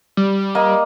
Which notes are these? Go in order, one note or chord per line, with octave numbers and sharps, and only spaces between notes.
G3
A#3 D#5